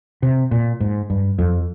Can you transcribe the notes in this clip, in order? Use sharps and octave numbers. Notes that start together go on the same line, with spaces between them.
C3
A#2
G#2
G2
F2